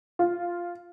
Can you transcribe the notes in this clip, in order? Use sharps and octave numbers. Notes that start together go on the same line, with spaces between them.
F4